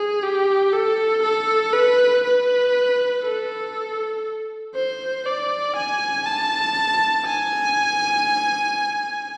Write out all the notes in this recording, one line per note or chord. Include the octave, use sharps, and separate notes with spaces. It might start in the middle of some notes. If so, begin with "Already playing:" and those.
Already playing: G#4
G4
A4
A4
B4
B4
A4
C5
D5
G#5
A5
G#5